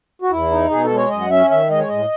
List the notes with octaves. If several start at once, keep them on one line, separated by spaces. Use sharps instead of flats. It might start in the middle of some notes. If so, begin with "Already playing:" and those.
F#4
E2 E4
D#4
B2 G#4
A4
G#3
C#5
F#2 D#5
F#5
C#4 E5
D#3 E5
G#3 D#5
C#5
A2 D#5